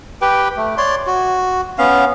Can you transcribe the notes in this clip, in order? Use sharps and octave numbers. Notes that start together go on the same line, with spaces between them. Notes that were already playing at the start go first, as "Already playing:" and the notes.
G4 B4 G5
A3
C#5 D5 C6
F#4
B3 C#4 F5